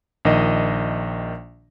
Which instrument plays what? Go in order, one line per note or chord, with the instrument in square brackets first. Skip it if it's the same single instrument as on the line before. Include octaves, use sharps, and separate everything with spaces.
[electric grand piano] A#1 D#3 D#5